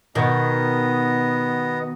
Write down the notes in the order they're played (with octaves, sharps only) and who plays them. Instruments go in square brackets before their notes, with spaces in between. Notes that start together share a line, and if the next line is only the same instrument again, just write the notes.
[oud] B2 D#3 [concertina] B3 D#5